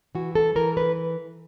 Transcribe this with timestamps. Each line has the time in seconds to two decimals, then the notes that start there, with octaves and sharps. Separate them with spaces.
0.15 E3 F#4
0.35 A4
0.55 E3 A#4
0.77 B4